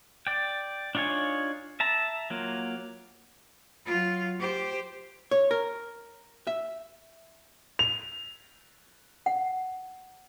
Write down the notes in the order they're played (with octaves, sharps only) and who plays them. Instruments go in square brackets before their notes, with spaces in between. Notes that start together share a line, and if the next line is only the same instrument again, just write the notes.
[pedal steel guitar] D5 G5
D4 D#4 F4 C#5 G#5
E5 A5 A#5
F#3 A#3 F4
[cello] F#3 F4
G4 C5
[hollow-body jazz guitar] C#5
A#4
E5
[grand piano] F7
[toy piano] F#5